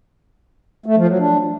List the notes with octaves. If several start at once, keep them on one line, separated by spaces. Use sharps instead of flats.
A3
F3
F#3
D4